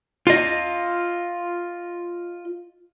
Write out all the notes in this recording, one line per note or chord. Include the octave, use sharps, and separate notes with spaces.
F4 D#5